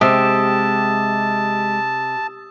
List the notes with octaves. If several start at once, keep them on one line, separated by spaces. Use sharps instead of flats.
C3 G#3 G4 A5 D#6 E6 E7